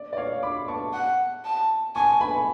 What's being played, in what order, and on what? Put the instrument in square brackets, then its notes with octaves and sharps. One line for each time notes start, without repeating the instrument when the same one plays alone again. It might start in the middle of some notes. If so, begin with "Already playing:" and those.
Already playing: [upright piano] D5
D5
C#5 F5
B5 D6
A5 C#6
[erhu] F#5
A5
[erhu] G#5 [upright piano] A5 C#6
[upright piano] G#5 B5